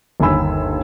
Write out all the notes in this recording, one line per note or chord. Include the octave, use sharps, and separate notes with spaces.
G1 D#2 D#3 G#5 B5 E6